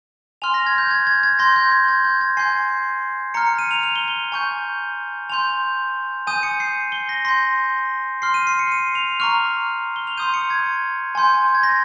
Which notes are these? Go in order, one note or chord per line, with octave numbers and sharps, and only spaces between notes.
G#5 C6 F6 F7
A#6
G#6
G6
G#6
G#6
G#6
C6 G6 A#6
G6
G#6
G#6
G6
G#6
G#5 C6 G6 C7
A#5 F6 C#7
C#7
D#7
F7
F7
G7
G7
G#5 C#6 G6
G#5 C6 G6 F7
G#5 D#6 G6 D#7
C#7
C7
G7
A#6
C6 G6 A#6
C6 F6 C7
D#7
C7
C#7
D#7
F7
A#5 C#6 F6 F7
G7
F7
C6 D#6 G6 D#7
C#7
G#6
G#5 C6 G6
G#6
A#6